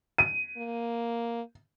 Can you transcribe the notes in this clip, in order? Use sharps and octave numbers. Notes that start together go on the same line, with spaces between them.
D#7
A#3